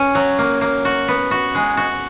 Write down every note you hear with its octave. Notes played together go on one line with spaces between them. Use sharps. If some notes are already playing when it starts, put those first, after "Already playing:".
Already playing: C#4
F#3
A#3
A#3
F#4
B3
F#4
G#3
F#4